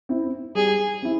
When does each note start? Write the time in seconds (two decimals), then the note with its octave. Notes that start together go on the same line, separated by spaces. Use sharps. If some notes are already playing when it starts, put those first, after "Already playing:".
0.09 C4 E4
0.55 G3 G#4
1.02 C4 E4